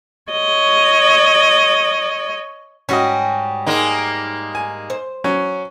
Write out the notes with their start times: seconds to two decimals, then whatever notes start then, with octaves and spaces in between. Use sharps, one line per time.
0.31 C#5 D#5
2.89 G#2 G3 C#4 F#4 D#5
3.66 G#3 A#3 D#4
4.55 G#5
4.90 C5
5.24 F#3 C#4